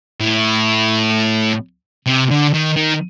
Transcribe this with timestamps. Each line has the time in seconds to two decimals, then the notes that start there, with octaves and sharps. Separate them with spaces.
0.21 A2
2.06 C3
2.30 D3
2.54 D#3
2.77 D#3